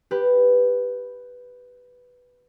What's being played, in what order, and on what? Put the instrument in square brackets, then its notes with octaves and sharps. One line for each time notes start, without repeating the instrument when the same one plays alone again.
[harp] G4 B4